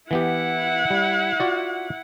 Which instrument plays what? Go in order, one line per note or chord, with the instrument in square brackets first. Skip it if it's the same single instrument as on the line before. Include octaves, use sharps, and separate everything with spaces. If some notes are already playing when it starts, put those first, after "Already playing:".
[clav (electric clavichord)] E3 B3 G4 [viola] E4 F#5
[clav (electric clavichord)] G3
F4 F#4 D5